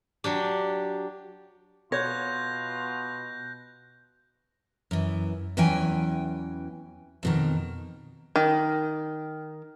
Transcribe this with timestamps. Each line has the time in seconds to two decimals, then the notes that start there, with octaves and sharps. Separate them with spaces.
0.24 F#3 D4 G4
1.92 B2 F4 C#5 F#6 G6 A#6
4.91 F#2 E3
5.57 E2 E3 F#3 C#4 G5 G#5
7.23 F2 B2 D#3
8.36 D#3